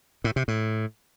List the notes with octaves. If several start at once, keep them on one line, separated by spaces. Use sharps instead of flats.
A2
C3
A2